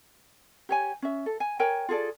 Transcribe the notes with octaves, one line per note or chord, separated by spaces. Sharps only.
G4 C#5 G#5
C#4 E5
A4
G#5
A#4 C#5 G5 G#5
F4 G#4 A4 D5